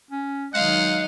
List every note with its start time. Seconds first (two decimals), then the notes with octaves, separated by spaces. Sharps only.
0.11 C#4
0.54 D#3 F#3 G#3 D#5 F5 F#5